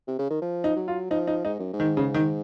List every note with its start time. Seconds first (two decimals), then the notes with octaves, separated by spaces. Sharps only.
0.07 C3
0.19 C#3
0.31 D#3
0.42 F3
0.64 D#4
0.76 F#3
0.88 F4
1.10 F3 D#4
1.27 D#4
1.45 G#2 D#4
1.59 F#2
1.73 G#2
1.80 D#3
1.97 C#3
2.14 D#3